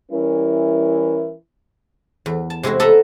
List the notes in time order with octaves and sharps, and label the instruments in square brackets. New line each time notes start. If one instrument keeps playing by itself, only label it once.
[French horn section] E3 G3 C#4 E4 A#4
[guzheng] E2
A5
C3 G#3 E4 F#4
A4 D#5 E5 F#5 A#5 B5